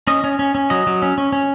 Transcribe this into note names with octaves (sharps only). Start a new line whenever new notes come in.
C#4 D#5
C#4
C#4
C#4
F#3 D#5
F#3
C#4
C#4
C#4